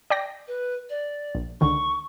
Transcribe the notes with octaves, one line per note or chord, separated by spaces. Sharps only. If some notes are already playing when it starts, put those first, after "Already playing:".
D5 G5 A#6
B4
D5
A#1
C#2 D3 D#3 C#6